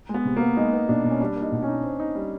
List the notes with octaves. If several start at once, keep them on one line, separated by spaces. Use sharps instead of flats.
G#3
B3
C3
A#3 B3
G#3 D#4
B3
B2 D4
B2 C#4
G3 D4
A#3
D#4
B2
C#4
D#4
C4
D#4
G3